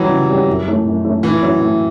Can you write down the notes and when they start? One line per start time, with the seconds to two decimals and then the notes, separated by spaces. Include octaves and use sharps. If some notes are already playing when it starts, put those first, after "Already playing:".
Already playing: E3 F#3 G3 C#4 G4
0.09 C#3
0.28 G3 C#4 G4
0.47 F#2
0.66 E3 A3 C#4
0.85 F#2
1.04 E3 A3 C#4
1.23 A2 E3
1.42 F#3 C#4 E4
1.61 A2